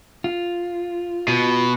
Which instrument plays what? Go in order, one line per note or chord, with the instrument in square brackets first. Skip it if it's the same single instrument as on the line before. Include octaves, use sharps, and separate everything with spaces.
[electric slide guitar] F4
[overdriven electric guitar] B2